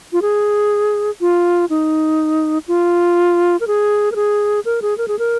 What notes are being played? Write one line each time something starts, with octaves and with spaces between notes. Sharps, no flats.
F4
G#4
F4
D#4
F4
A#4
G#4
A#4
G#4
A#4
G#4
A#4
G#4
A#4